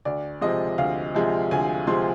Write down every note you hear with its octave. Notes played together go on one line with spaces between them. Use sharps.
D2 D5
C3 F3 G#3 D#5
D2 F5
C3 F3 G#3
D2 G#5
C3 F3 G#3 C6